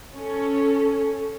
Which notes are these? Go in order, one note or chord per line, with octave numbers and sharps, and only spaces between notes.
C#4 A4